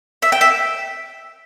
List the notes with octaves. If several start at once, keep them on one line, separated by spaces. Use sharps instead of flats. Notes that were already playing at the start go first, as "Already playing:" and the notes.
E5
G5
E5